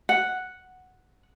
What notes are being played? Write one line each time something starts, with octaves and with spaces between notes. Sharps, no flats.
F#5